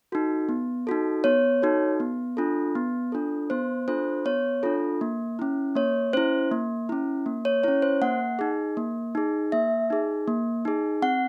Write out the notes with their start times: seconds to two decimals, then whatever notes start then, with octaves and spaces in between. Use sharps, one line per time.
0.12 D#4 F#4 A4
0.49 B3
0.87 D#4 F#4 A4
1.24 B3 C#5
1.62 D#4 F#4 A4
2.00 B3
2.37 D4 F4 A4
2.75 B3
3.12 D4 F4 A4
3.50 B3 C5
3.88 D4 F4 A4 C5
4.25 B3 C#5
4.63 D4 F4 A4
5.01 A#3
5.39 C#4 E4
5.75 A#3 C#5
6.13 C#4 E4 C5
6.51 A#3
6.89 C#4 E4
7.26 A#3
7.45 C#5
7.63 C#4 E4 C#5
7.82 C5
8.02 A#3 F#5
8.39 D#4 G#4
8.77 A#3
9.15 D#4 G#4
9.52 A#3 E5
9.90 D#4 G#4
10.27 A#3
10.65 D#4 G#4
11.02 C4 F#5